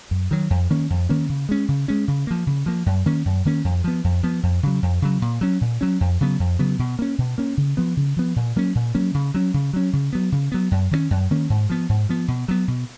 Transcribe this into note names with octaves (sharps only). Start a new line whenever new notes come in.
F#2
D#3 F#3
F2
D#3 A#3 C#4
F2
D#3 A#3 C#4
C#3
G#3 C#4
C#3
G#3 C#4
C#3
F3 A#3
C#3
F3 A#3
F#2
D#3 A#3 C#4
F#2
D#3 A#3 C#4
F2
F3 B3
F2
F3 B3
F2
C#3 F#3
F2
C#3 F#3
A#2
F#3 C#4
A#2
F#3 C#4
F2
C#3 F#3 B3
F2
C#3 F#3 B3
B2
A#3 C#4
B2
A#3 C#4
C#3
F3 B3
C#3
F3 B3
A#2
F#3 A#3 C#4
A#2
F#3 A#3 C#4
C#3
F#3 C#4
C#3
F#3 C#4
C#3
F#3 B3
C#3
F#3 B3
F#2
D#3 A#3 C#4
F#2
D#3 A#3 C#4
G#2
F3 B3
G#2
F3 B3
B2
F#3 B3
B2